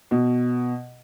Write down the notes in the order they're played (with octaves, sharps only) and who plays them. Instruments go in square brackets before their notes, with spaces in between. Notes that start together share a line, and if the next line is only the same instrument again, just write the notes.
[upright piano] B2